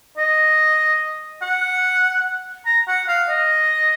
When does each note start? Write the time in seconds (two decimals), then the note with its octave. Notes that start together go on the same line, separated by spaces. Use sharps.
0.17 D#5
1.42 F#5
2.66 A#5
2.88 F#5
3.08 F5
3.29 D#5